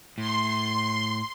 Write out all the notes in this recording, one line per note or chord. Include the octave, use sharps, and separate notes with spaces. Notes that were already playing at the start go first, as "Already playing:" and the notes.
A2 C6